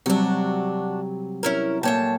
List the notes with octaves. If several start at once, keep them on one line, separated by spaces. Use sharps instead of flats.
C3 F#3 G3 D4 F#4
C#4 E4 A#4
A#2 A3 C#5 G5 A5 G6